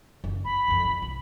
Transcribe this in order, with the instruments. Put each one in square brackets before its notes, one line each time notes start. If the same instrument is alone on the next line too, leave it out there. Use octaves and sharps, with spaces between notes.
[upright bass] F#1
[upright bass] F2 [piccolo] B5
[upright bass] F#1 F2
F2
C2